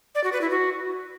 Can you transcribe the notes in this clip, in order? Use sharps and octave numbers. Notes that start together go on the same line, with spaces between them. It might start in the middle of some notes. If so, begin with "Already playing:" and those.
D5
F#4
B4
E4
F#4